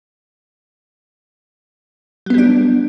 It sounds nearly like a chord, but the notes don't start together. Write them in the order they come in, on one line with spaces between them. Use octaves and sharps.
F#3 B3 G3 D4